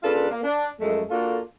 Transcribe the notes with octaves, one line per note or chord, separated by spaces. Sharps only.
C#3 A#3 D4 F4 A4 B4
A#3
D4
F#2 F3 G#3 A3
A#3 D4 F4 F#4 A4